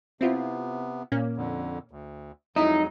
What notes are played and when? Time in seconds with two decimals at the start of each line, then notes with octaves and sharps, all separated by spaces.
0.21 C3 B3 C4 E4 F4
1.12 A#2 A#3 C#4
1.37 F2 D3
1.91 D2
2.56 F2 F#3 G#3 D#4 E4 D#5